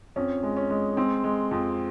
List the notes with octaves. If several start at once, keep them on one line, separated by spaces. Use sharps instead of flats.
F2 C#4
G#3
C#4
G#3
G#3 C4
G#3
F2